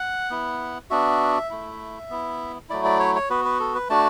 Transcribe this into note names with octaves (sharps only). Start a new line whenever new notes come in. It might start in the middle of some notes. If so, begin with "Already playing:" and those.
Already playing: F#5
B3 E4
B3 D4 F#4 E5
A3 E4
B3 E4
F#3 A3 E4 D5
D5
C#5
C#5
B3 F#4 B4
B4
A4
B4
A3 D4 F#4 A5